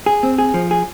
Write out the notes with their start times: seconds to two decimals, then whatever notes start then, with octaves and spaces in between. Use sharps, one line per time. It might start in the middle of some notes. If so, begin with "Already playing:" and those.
0.06 G#4
0.23 C4
0.38 G#4
0.54 F3
0.71 G#4